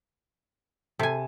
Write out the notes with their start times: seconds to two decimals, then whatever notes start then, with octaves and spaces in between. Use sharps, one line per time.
0.99 C3 A4 G#5